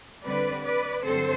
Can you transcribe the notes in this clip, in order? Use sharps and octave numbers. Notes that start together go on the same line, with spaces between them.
D3 G3 C4 B4 D5
B4 D5
G2 D3 F#3 C4 A4 C5